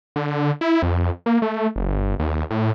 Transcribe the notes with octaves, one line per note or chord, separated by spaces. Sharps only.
D3
E4
F2
A#3
A3
F#1
G1
D#2
A2